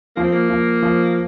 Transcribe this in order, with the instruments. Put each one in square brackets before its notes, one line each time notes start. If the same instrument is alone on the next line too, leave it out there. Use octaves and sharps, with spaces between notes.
[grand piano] F3 [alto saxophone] A#3
[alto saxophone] C4
A#3
[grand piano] F3
F3